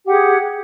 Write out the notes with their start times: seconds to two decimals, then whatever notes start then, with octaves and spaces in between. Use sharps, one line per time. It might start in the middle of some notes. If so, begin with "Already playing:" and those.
0.05 G4
0.07 F#5
0.10 G#4